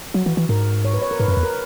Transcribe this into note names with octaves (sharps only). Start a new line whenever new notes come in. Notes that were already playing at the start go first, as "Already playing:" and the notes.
F#3 F#4
E3
E3
G#2 A#4
C#5
B4
C#5
A#4
G#2 B4
F#2
B4
E2
A#4